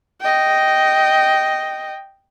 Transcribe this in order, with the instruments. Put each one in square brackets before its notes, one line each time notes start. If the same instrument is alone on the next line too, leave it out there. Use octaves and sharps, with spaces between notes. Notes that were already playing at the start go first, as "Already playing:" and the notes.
[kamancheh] D#5 G5